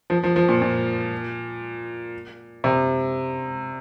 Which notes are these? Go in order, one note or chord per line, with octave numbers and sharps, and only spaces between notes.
F3
F3
F3
A#2
A#2
C3